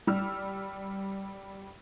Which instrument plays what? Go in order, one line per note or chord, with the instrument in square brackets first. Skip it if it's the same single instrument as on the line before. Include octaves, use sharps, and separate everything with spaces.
[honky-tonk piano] G3 E6 F6